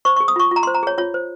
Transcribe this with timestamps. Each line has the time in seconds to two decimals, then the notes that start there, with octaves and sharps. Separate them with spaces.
0.05 C5 C#6
0.16 C#6
0.20 G#4
0.28 D#6
0.36 F4 C#6
0.51 F4 A#5
0.63 C6
0.67 C5
0.74 A#5
0.83 G#4 C#5
0.98 F4 C#5
1.14 C5